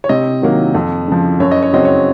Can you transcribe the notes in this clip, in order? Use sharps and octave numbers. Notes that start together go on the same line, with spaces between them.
C#5
C3 D#5
D#3 F#3 A#3
F2
C#3 F3
F#2 C#5
D#5
C#5
C#3 F#3 C4 D#5
C#5